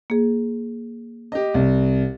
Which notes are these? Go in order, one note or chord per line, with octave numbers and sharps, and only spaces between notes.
A#3 G#4
G4 D#5
C2